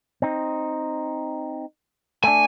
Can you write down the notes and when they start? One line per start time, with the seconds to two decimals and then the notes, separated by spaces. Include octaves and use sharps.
0.22 C4 D#4
2.24 A3 D4 G#5